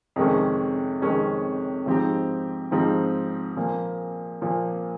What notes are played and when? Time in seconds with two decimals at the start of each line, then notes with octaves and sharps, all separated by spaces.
0.16 F2 C3 D#3 G#3 C#4
1.02 F2 C3 D#3 G#3 C#4
1.86 G#2 F3 C4 D#4 G4
2.71 G#2 F3 C4 D#4 G4
3.56 A#2 F3 A#3
4.41 A#2 F3 A#3